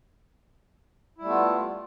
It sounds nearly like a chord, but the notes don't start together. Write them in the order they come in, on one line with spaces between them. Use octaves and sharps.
E4 G3 A3 B3 F4